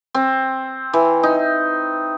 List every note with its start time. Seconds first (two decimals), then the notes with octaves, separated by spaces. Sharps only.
0.15 C4
0.93 E3
1.23 D#4